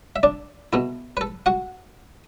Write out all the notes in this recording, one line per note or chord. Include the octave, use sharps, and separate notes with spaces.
E5
D4 D5
B2 A3 E4
B4
A4
F#4 F#5